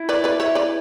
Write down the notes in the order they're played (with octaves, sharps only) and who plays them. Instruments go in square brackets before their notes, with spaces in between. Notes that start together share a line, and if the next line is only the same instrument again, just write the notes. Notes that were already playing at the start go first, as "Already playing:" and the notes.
Already playing: [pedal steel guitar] E4
[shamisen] B4 D5
B4 D5
C#5 E5
B4 D5